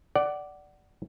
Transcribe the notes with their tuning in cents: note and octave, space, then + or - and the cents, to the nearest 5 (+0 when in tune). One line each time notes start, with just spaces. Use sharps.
D5 +0 F#5 +20